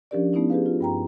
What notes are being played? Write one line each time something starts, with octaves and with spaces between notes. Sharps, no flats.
F3 C#4 D4 G4 A#4 D5
A3 B3 C#4 D#4 E4
G4 G#4 B4 F5
F4
G2 G5 A#5